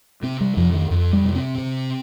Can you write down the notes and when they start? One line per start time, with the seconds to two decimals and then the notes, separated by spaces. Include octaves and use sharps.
0.23 C3 C4
0.41 G3
0.57 F2 F3
0.74 D#3
0.90 F2
1.13 G3
1.24 C3
1.36 C4
1.58 C3